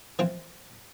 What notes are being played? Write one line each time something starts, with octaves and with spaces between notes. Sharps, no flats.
E3 F3 C4